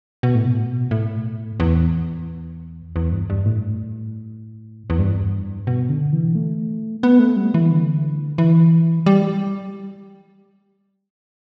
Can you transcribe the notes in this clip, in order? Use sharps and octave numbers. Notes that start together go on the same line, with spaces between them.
B2
A2
B2
A2
E2
E2
G2
G2
A2
E2
G2
B2
D3
E3
A3
B3
A3
G3
E3
D3
E3
G3